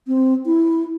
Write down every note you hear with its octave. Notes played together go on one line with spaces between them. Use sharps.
C4
E4